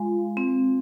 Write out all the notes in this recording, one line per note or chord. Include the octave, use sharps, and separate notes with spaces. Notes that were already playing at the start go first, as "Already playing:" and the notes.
Already playing: G#3 F4
C4